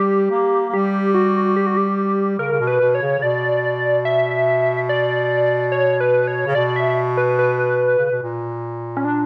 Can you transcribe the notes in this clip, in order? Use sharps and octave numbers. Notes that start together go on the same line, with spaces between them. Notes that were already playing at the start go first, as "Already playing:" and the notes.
Already playing: G3 G4
A#3
A#3
G3 G4
F#4
G4
F#4
G4
C#3 A#4
C#3
B2
B4
B2
C#5
C#3
C#3
B2 D5
E5
D5
C#5
B4
C#5
C#3
B2 D5
E5
B4
B4
C#3
B2
A#2
C#4
D4